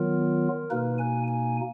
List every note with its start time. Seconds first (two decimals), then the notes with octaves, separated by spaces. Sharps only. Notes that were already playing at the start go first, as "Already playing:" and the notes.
Already playing: D#3 F#3 B3 F4 A#4
0.70 B2 A#3 D#4 B4
0.98 G#5
1.27 G#5